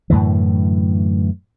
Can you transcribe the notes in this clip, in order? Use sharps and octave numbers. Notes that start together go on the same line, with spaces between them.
F#2 A2 D3 E3